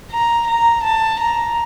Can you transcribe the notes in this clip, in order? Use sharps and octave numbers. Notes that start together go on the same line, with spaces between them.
A#5
A#5
A5
A#5